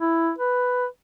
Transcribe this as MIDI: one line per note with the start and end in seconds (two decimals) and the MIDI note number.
0.01 0.32 64
0.38 0.86 71